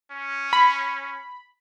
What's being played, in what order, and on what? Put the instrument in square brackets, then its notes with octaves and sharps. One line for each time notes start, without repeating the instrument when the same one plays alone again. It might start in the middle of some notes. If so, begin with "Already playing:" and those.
[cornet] C#4
[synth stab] B5